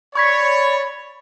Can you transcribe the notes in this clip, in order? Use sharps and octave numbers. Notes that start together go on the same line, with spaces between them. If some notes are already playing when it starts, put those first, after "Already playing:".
C#5 D5 B5 C#6 G#6 B6